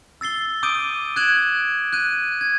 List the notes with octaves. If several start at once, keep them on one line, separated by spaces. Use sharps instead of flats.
E6 A6 C7 G7
D6 D#6 G6 D7 D#7
F#6 G#6 D7 E7 F#7
F#6 G6 D#7
G#6